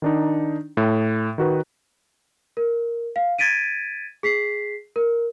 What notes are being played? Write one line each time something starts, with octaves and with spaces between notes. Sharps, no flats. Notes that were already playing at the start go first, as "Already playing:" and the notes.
D#3 D4 D#4
A2
D#3 F#4 B4
A#4
F5
G#6 A6 B6 D7 D#7
G#4 B6 C7
A#4